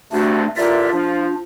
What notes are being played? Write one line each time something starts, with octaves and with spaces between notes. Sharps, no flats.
D2 G2 C3 A3 D4 F#4
A1 D3 F4 A#4 D5 E5
F3 D4